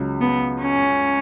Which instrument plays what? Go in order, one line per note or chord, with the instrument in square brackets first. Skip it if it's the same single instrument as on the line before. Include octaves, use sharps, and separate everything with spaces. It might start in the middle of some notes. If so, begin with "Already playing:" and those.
Already playing: [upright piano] C#2 C#3 F#3
[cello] B3
C#4